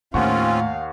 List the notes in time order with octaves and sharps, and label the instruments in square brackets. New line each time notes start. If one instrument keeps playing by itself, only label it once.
[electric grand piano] D#2 F#5 C#6 [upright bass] A2 [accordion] C4 C#4 F4 [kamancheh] F5